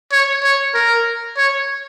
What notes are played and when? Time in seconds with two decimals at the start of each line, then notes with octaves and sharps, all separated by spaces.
0.12 C#5
0.43 C#5
0.74 A#4
1.37 C#5